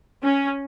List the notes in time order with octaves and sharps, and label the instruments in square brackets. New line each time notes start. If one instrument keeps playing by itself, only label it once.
[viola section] C#4